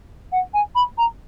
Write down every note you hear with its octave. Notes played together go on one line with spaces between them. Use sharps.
F#5
G#5
B5
A#5